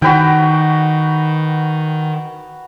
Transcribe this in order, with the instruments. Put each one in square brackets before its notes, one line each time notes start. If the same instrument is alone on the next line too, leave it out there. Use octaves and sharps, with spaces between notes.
[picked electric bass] D#3 [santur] F#4 B4 G5